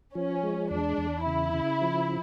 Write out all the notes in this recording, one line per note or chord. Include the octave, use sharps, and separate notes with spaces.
F3 C#4
G#3
E2 D4
E2
C#3 E4
C#3
F3